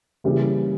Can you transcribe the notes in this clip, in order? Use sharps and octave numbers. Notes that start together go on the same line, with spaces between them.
C#3 E3 G3 A#3